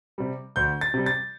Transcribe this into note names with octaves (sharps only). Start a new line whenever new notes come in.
C3 G3
D2 G6
A6
C3 G3
A6